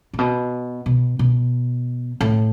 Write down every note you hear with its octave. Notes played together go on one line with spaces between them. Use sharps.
A2
B2
B2
B2
A2